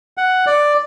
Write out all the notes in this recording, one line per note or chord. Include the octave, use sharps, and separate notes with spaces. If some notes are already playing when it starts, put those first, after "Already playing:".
F#5
D5